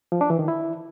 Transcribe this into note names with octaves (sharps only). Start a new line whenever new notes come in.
F3
D4
E3
D#3
E4